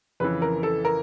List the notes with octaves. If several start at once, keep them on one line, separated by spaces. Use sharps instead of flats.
F2 C#3 E3 B4
A#4
A4
A#4